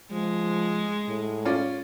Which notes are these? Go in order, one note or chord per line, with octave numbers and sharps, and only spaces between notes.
F3 G#3
A2
C#4 F4 D5